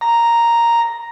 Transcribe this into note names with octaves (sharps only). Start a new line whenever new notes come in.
A#5